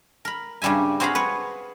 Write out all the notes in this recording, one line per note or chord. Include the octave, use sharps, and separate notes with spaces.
A#4 B5
G2 C#3 G3 E5 G#5
C4 F#4 G#4 F5 A#5 B5
B4 C#5